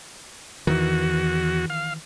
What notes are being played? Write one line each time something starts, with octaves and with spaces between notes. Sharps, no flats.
E2 D#3 E3 F#4
F5